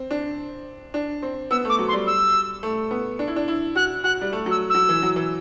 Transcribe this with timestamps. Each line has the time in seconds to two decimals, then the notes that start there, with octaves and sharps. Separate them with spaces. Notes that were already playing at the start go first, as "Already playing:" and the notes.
Already playing: C4
0.11 D4
0.94 D4
1.23 C4
1.51 B3 E6
1.65 A3 D6
1.79 F#3
1.88 C6
1.93 G3
2.07 E6
2.63 A3
2.91 B3
3.19 D4
3.28 E4
3.36 D4
3.48 E4
3.75 F#4 F#6
4.04 F#4 F#6
4.21 G3
4.33 A3
4.46 F#3 E6
4.70 F#3 E6
4.89 E3
5.03 F#3
5.16 E3